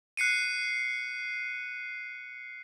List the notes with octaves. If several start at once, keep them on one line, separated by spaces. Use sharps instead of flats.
F#6 C7 C#7 D#7